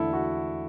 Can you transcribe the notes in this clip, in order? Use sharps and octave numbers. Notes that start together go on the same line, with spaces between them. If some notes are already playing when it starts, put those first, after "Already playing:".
Already playing: E2 D3 A3 E4 A4
F#4